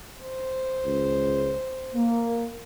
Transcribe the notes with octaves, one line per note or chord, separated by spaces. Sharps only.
C5
C#2
A#3